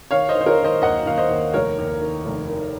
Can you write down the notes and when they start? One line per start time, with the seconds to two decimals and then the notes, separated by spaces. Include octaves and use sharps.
0.11 D#3 C#5 F5
0.29 C5 D#5
0.35 D#3
0.41 C5
0.46 A#4 C#5
0.59 D#3
0.64 C5 D#5
0.82 D#2 D#5 F#5
1.06 D#2 F5
1.18 C5 D#5
1.30 D#2
1.53 F1 A#4 C#5
1.78 D#2
2.01 D#3
2.25 F1
2.49 D#3